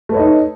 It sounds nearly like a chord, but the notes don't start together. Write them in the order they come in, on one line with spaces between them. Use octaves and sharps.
A3 B4 C#5 D#5 D#4